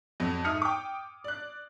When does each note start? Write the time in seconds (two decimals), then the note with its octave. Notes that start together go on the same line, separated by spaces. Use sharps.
0.20 F2 F#3
0.45 G#2 E5 D#6 F6 C#7
0.62 G5 D6
1.24 D5 F#6